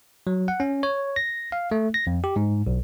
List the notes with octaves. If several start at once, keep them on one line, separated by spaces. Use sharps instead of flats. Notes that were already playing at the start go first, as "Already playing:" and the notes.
F#3
F#5
C#4
C#5
A#6
F5
A3
A#6
F2
G4
G#2
B1